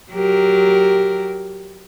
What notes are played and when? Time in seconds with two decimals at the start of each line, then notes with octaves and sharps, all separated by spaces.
0.12 F#3 G4 A#4